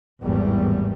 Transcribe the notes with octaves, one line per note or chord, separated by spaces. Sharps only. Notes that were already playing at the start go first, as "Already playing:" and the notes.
G#1 E2 A2 G3